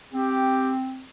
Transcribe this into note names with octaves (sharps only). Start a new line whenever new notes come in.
C4 G4